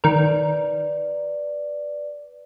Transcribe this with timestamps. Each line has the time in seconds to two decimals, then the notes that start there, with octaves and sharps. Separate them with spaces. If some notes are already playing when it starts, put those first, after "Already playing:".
0.04 D#3 A#4 B4 D5